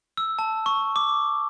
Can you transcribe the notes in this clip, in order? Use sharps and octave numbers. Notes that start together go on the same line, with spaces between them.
E6
A5
C#6
D6